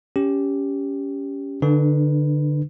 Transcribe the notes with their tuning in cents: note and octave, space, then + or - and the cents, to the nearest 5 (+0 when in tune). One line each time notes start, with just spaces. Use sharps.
C#4 +15 G4 +0
D3 +0 D4 +40 B4 +0